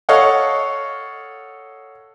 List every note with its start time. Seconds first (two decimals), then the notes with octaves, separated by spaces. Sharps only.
0.09 A4 C#5 D#5 F5 F#5